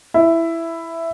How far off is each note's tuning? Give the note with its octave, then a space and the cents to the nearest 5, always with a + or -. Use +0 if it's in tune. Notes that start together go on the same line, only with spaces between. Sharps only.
E4 +10